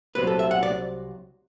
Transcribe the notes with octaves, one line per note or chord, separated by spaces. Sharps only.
C2 C3 F#3 B4
A4
E5
F#5
D5